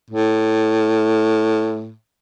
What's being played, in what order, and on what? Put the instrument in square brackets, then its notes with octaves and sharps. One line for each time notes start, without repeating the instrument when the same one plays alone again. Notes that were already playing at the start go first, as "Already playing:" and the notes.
[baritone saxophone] A2